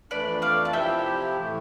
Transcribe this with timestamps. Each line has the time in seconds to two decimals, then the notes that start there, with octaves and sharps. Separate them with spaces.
0.11 F2 E3 A3 D4 B4 D5
0.42 D5 F5
0.65 A5
0.73 C3 F3 C4 E4 G4 E5 G5
1.36 A2 E3 A3